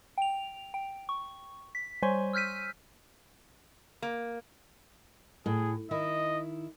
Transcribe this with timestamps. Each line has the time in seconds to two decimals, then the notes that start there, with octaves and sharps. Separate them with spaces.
0.18 G5 F7
0.74 G5
1.09 C#6
1.75 B6
2.02 G3 C5 C#5 G#5 C6 C#6
2.33 E6 F6 G6 B6 D#7
4.02 A#3
5.46 A2 G#4
5.91 D#3 E4 D#5